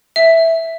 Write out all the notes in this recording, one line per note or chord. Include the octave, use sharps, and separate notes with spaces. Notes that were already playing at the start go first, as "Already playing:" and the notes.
E5